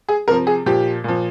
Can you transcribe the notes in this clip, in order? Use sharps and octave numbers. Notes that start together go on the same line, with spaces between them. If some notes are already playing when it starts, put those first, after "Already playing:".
G#4
C3 F3 A#4
G#4
A#2 F3 G4
A#2 F3